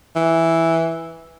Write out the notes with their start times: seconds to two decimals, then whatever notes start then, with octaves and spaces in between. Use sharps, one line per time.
0.16 E3